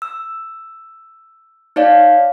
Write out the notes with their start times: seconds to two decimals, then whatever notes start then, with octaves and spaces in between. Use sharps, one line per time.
0.02 E6
1.76 D#4 C#5 D5 F5